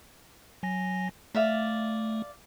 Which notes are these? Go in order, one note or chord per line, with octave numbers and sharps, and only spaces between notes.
F#3 G#5 A#6
A3 D5 E5 F5